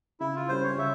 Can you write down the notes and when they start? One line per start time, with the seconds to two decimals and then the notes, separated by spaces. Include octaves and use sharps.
0.20 C#3 E4
0.36 F4
0.49 G3 C#4 C5
0.64 C#5
0.78 C#3 E5